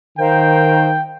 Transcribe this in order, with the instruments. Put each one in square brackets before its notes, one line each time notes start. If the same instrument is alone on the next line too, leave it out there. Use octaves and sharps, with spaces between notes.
[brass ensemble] D#3 [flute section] A#4 C5 F5 [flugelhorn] G5